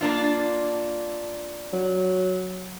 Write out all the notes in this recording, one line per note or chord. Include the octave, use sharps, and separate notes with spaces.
A#3 D4 F4
F#3